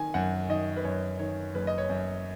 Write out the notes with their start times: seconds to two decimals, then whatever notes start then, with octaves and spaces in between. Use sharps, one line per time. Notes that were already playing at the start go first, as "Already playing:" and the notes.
Already playing: D#3 G#5
0.14 F#2 F#5
0.49 D#3 D#5
0.76 B4
0.85 F#2 C#5
1.19 D#3 C#5
1.54 F#1 B4
1.67 D#5
1.78 C#5
1.90 F#2